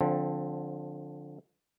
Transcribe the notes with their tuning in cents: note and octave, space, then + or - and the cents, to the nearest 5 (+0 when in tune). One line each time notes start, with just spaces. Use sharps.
D3 +0 F3 +20 C4 +0